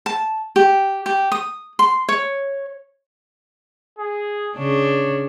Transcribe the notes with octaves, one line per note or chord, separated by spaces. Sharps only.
A5
G4
G4
D#6
C6
C#5
G#4
C#3 D4 C#5